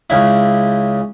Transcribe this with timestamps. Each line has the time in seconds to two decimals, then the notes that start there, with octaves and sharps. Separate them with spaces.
0.10 C#2 C#3 E4